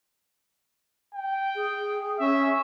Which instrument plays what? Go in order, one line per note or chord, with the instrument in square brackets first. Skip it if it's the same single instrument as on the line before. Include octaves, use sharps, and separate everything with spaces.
[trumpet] G5
[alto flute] G#4
[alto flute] C#4 [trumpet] E5